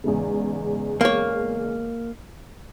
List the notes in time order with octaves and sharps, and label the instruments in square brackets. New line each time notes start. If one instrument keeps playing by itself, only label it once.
[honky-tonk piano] E2 G#2 C#3
[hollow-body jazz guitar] A#3 C#5